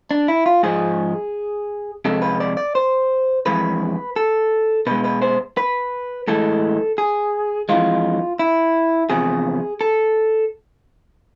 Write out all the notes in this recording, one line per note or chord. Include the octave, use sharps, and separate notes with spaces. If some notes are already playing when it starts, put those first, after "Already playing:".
D4
E4
F4
G#2 F3 G#3 G#4
F2 C3 G#3 A4
B4
D5
D5
C5
F2 E3 G#3 B4
A4
B2 G#3 B4
B4
C5
B4
A2 E3 G#3 A4
G#4
F2 E3 G#3 F4
E4
E2 C3 F3 G#4
A4